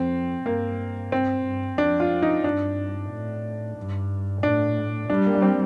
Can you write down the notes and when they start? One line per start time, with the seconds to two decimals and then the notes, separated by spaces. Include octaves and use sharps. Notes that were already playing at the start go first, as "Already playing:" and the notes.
Already playing: F2 C4
0.45 G2 A#3
1.11 G2 C4
1.45 G2
1.78 F2 D4
2.00 F4
2.22 D#4
2.44 G2 D4
3.11 A2
3.77 G2
4.43 A2 D4
5.10 G3 D4
5.26 A#3
5.35 D4
5.42 C4